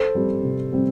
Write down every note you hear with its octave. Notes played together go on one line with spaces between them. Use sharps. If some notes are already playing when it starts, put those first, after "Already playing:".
Already playing: A4 C5
G3 C4
C3
G3 C4